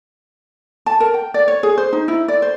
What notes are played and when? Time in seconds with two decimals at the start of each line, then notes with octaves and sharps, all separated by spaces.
0.86 A5
1.00 A#4
1.14 G5
1.34 D5
1.48 C#5
1.63 G#4
1.78 C5
1.93 D#4
2.08 E4
2.28 D5
2.42 C5